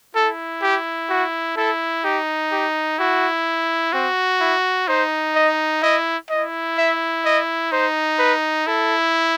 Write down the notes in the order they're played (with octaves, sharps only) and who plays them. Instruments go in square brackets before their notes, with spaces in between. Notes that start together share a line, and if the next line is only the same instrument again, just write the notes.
[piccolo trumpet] E4 [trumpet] A4
[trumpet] G4
F#4
[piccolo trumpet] E4 [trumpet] A4
[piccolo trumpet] D#4 [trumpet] G4
[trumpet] G4
[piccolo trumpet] E4 [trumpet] F#4
[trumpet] C4 [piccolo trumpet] F#4
[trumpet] E4
[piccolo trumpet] D#4 [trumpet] C5
[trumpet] D#5
[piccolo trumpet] E4 [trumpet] D#5
[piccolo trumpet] E4 [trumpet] D#5
[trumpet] E5
D#5
[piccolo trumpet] D#4 [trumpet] C5
[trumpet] B4
[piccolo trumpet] E4 [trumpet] A4